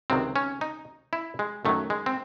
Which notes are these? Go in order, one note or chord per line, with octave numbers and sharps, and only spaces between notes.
C#2 C3 D#3 F#3 C4
C#4
D#4
E4
G#3
F#2 D#3 F#3 A3
G#3
C4